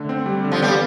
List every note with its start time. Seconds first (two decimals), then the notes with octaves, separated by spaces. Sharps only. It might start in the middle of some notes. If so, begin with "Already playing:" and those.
Already playing: D3 A3
0.09 C4
0.26 G3
0.44 D3
0.52 F3
0.62 G3 B3